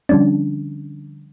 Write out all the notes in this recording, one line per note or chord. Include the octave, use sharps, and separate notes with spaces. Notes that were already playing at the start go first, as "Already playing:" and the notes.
D3 F3 G3 C#4 D4